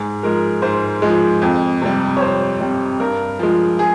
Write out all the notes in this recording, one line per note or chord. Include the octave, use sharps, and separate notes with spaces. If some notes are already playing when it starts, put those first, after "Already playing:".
Already playing: G#2 G#4
F3 G#3 A#4
G#2 C5
F3 G#3
F2
C3 G3
C#5
F2 C5
C3 G3
G2 A#4
F3 G#3
G#4